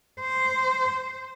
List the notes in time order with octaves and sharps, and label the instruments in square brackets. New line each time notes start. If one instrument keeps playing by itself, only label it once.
[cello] C5